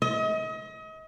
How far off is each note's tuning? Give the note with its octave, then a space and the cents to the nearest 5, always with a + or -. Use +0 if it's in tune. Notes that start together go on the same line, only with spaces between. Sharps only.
D#5 +35